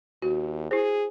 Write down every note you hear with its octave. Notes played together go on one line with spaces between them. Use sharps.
D#2 F#4
E4 G#4 C5